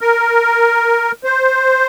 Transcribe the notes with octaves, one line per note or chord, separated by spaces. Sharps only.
A#4
C5